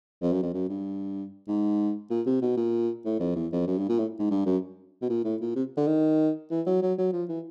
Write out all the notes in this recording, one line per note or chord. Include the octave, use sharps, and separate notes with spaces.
F2
F#2
F2
F#2
G2
G#2
A#2
C3
B2
A#2
A2
F2
E2
F2
F#2
G2
A#2
A2
G#2
G2
F#2
B2
A#2
A2
A#2
C3
D3
D#3
E3
F#3
F#3
F#3
F3
E3